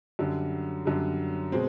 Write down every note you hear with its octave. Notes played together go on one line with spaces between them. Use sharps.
F#2 D3 G3
F#2 D3 G3
B2 G#3 C4